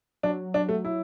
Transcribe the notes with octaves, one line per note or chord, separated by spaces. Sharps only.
F#3 D4
D4
A3
E4